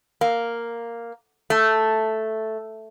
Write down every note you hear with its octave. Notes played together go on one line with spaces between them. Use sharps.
A#3
A3